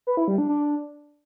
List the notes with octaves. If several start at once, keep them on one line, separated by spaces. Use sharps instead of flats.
B4
E4
G3
D4
D4